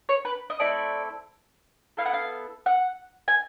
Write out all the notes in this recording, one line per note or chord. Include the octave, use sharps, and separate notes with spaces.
C#5
B4
D#5
A3 C4 E4 A4 D5
B3 E4 A4 F5
F#5
F5
F#5
G#5